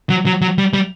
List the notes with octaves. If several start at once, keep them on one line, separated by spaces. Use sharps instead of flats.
F#3
F#3
F#3
G3
G3